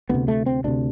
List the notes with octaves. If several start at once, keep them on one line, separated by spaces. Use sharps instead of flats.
D2 C3 B3
A3
C4
D2 C3 D4